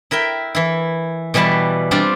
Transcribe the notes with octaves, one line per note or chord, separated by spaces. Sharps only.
E4 A#4 E5 G5
E3 E4
B2 E3 G3 B4 A5
G3 C4 D4 F4